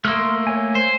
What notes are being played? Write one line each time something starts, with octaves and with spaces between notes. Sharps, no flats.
A3 A#3 C6 D#6 F6
C#5 G#5
C5